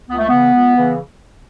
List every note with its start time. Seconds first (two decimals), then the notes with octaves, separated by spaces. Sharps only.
0.08 C#2 B3
0.18 A3
0.28 C#3 E3 B3
0.53 C#2
0.76 C#3 E3